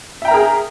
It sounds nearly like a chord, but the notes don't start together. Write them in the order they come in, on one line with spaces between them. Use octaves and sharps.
E5 G5 A#5 A#4 G#4